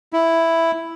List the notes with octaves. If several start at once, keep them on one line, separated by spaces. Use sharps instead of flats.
E4